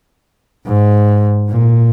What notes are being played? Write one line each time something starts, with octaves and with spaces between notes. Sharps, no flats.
G#2
A#2